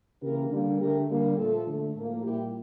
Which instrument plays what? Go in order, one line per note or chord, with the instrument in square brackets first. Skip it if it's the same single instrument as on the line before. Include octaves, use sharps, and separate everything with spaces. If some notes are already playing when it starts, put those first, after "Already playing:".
[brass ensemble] C#3 E3 A#3 G4 A#4
D3 G3 A#3
D3 A3 G4 A#4
D3 G3 A#3
A#2 F3 A3 F4 A4
D3 A3
A2 F3 A#3
A#2 G3 A#3 E4 G4